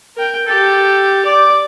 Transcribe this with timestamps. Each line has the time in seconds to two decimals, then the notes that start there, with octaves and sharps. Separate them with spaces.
0.16 A#4 G5
0.47 G4 A4
1.26 D5 D6